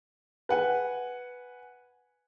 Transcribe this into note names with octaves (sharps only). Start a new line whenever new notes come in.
B4 F#5 G#5